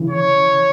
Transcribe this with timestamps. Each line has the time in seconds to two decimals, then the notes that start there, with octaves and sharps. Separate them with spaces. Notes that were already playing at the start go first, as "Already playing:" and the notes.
Already playing: C#3 E3
0.10 C#5